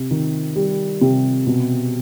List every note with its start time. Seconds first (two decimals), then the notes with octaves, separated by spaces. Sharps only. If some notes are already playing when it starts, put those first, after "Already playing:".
Already playing: C3
0.11 D#3
0.56 G3
1.01 C3
1.46 B2